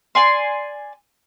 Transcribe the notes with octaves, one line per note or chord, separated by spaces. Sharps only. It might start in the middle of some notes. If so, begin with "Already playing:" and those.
D5 G#5 C6